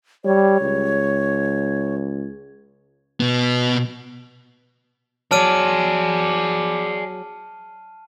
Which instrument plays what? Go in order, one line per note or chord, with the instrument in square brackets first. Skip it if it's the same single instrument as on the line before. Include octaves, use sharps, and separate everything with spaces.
[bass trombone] G3 [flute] C#5
[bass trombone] C#2
[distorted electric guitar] B2 B3
[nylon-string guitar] F#3 [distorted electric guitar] G#4 D5 [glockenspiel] A5 F6 D#7